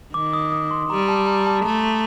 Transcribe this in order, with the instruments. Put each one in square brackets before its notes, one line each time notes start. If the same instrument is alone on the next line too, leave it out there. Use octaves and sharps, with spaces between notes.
[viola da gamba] D#3 [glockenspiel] D6
[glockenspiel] D#6
D#6
C6
[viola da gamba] G3 [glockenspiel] A#5
[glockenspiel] A5
A#5
A5
[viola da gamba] A3 [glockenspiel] A#5